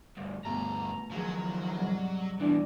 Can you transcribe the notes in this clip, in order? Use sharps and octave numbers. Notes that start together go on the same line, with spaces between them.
D2 G2
D2 G2 B2 A3 A#5
D#3 F3 F#3 G#4 A#5
G#2 C3 G3
D2 B2 E3 D4 D5